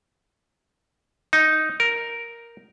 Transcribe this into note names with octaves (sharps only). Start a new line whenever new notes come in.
D#4
A#4